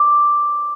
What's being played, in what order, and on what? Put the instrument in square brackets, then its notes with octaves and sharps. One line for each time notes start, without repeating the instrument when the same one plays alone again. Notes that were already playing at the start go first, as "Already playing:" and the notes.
Already playing: [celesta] D6